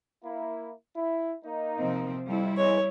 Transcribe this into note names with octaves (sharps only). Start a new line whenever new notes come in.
A#3 E4
E4
A#3 D#4
C3 F3 C4
F2 G3 E4
E2 A#2 G#3 C#5